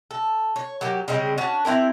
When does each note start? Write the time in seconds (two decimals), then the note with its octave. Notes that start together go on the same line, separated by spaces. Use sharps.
0.11 A4
0.56 C#5
0.81 F#3 A#3 G4
1.08 C#3 G3 G#3 C4
1.38 C#4 D4 F#4 A5
1.65 C4 E4 G4 A#4